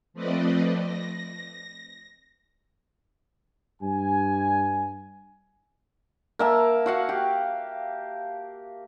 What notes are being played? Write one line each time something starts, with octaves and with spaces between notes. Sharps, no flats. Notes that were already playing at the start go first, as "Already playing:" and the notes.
F3 A3 C4 B4 D5 D#5
A#6
G2 G#5
A#3 E5 A5
F#4 F5 F#5
G4